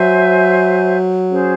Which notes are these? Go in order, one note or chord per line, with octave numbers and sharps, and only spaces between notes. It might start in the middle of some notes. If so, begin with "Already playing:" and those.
Already playing: F#3 C5 E5 G#5
C#4 G#4 C5